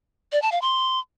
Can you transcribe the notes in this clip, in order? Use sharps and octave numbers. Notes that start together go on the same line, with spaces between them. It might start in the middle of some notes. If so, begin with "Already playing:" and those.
D5
A5
F5
C6